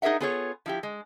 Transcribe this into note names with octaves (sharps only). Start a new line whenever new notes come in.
D#4 G#4 A#4 E5 F#5
B3 F4 G#4 A4 C#5
F3 E4 G4
G#3